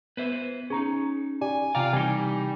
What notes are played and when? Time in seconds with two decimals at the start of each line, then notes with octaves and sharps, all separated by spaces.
0.17 B3 B4 C5 E5
0.70 C#4 D#4 G#4 A#5
1.41 G4 D5 G#5
1.75 C3 F4 D5 F5 G5 A#5
1.93 C3 E3 G3 D#4 G#5